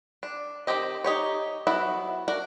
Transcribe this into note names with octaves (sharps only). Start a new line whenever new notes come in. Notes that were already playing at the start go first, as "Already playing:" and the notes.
D4
D#3 E3 C4 G4 D#5
D#4 G4 C#5
F#3 B3 E4 F#4 E5
D4 F#4 A#4